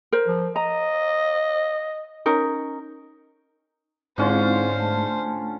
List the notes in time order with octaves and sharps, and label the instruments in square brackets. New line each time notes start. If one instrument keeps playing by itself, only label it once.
[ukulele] A#4 C5
[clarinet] F3
[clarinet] D#5 [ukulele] A#5
[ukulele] C#4 D#4 A#4
[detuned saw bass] G#2 [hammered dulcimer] D3 C#4 F4 [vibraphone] C4 E4 F5 [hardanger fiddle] C5
[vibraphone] A3 A5